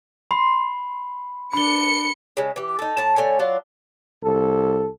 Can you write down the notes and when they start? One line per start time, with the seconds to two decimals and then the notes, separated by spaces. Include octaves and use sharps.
0.31 B5 C6
1.53 D4 B5 C#7 G7
2.37 C#3 G#3
2.56 E3 G4
2.79 D#4 A4
2.97 A2 A5 A#5
3.16 D3 A3 C#5 G#5
3.39 F#3 D4 F4
4.23 C2 A4